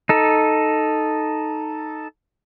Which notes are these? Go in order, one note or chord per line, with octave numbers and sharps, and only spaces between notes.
D#4 A4